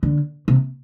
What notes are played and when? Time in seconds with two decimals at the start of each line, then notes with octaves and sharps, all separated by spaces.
0.03 D3
0.48 C3